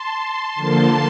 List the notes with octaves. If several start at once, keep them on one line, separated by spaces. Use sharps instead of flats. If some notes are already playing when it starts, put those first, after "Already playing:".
Already playing: A5 C6
D3 F3 A#3